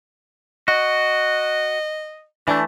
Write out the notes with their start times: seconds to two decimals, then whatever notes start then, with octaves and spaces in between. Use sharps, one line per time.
0.68 F#4 D#5
2.48 E3 A3 D4